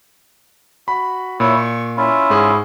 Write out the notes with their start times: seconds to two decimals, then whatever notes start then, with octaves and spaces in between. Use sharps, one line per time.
0.88 F#4 B5
1.40 A#2 E4 C#5
1.57 C#6
1.97 C#4 E4 F4
2.30 G#2 G#4